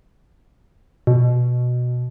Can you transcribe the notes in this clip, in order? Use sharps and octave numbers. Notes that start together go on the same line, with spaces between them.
B2